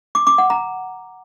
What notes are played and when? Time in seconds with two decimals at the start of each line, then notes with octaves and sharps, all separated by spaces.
0.15 D6
0.27 D6
0.38 F#5
0.50 A#5